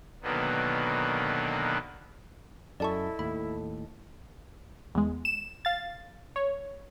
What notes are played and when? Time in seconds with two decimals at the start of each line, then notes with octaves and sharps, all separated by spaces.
0.23 B2 D3 D#3 F#3 A#3 B3
2.80 F#2 E4 A4 D5 D#5 A5 C#6
3.19 D#2 A2 B5
4.95 E2 G#3
5.25 E7
5.65 F5 A6
6.36 C#5